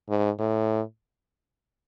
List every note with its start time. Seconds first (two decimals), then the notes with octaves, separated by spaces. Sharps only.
0.09 G#2
0.39 A2